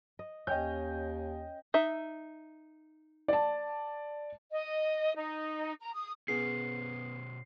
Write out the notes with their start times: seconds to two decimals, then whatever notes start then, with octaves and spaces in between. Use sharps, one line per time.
0.19 D#5
0.47 D#2 C#4 D#5 G5 G6
1.74 D#4 E5
3.28 D5 A5
4.51 D#5
5.16 D#4
5.80 A#5
5.94 D#6
6.28 B2 B3 C#4 G#4 C7